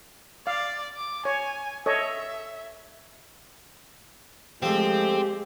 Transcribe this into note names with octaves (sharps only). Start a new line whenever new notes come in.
D5 F5
D6
C#5 G#5
A4 C#5 D#5 E5
F3 G#3 A3 C4 G4